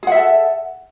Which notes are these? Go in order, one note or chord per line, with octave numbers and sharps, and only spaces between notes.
G#4 A4 E5 F#5